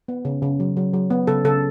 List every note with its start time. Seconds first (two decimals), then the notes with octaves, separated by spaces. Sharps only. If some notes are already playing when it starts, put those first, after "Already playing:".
0.08 B3
0.25 C#3
0.42 C#3
0.60 F#3
0.77 F#3
0.94 F#3
1.10 B3
1.27 C#3 A4
1.44 C#3 A4